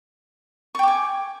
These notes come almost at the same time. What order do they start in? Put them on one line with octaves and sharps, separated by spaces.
C#6 G5 D6 G#5